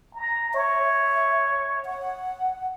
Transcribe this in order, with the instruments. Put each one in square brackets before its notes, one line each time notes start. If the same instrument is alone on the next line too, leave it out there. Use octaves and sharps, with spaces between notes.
[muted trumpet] A#5
[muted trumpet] C#5 [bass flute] E5
[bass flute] F#5